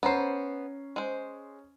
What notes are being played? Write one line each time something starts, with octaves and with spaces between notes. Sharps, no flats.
B3 C#4 C5 A#5 C7
G#3 C5